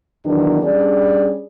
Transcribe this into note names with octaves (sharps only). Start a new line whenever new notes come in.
E2 D#3 F#3 B3 D4
G3 C#4 D4 G#4 D5